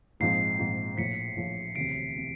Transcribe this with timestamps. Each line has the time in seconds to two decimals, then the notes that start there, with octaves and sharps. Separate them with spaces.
0.20 A#1 G#2 F3 G#3 C4 C7
0.59 A#1 G#2 F3 G#3 C4
0.97 A#1 A2 F3 B6 C#7
1.37 A#1 A2 F3
1.75 E1 D2 C3 C7 D7
2.18 C3